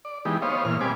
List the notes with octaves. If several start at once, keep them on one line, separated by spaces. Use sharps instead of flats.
D5
E3 G#3 B3 D#4 G4
B3 C5 C#5 D#5 F5
A#2 E3 F6
G3 C4 B4 G#5 D6